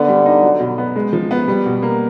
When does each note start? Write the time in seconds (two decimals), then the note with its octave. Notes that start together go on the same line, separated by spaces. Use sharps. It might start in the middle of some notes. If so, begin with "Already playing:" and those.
Already playing: D3 B3
0.08 G3
0.25 D#4
0.43 F#3
0.60 B2
0.78 B3
0.96 G#3
1.13 F3
1.31 B3
1.48 G3
1.66 B2
1.82 A#3